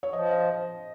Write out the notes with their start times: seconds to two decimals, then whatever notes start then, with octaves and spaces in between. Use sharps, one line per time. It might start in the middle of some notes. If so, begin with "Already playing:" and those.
0.03 C#5
0.13 F3 D#5
0.31 D#5